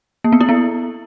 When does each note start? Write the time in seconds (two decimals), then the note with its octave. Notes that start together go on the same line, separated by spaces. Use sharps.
0.24 A#3
0.32 B3
0.41 E4
0.49 B3